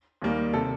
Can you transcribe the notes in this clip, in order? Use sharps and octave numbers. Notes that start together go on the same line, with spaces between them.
D#2 D#3 G3 A#3
C3 A4